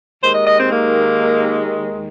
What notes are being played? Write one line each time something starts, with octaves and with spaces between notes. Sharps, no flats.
D#2 D#3 G#3 C5
D#5
D#5
C4
A#3